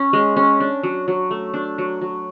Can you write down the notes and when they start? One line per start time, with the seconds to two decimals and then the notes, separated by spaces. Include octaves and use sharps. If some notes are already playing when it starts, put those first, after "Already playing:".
Already playing: C#4
0.13 G#3
0.36 C#4
0.60 D4
0.83 F#3
1.08 F#3
1.31 A3
1.54 D4
1.78 F#3
2.02 F#3